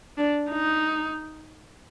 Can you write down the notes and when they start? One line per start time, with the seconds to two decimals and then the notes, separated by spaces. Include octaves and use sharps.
0.18 D4
0.50 D#4